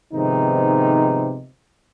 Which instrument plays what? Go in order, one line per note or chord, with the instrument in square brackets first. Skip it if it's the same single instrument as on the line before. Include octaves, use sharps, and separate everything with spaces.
[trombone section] G#2 C3 D#3 F3 B3 D#4